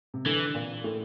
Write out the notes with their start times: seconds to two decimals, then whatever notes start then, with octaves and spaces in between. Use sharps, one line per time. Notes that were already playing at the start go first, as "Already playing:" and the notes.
0.14 C3
0.26 D3 E3
0.54 A#2
0.84 A2